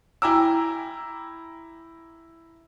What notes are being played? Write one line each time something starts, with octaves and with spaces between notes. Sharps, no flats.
E4 G5 G#5 A#5 D6 E6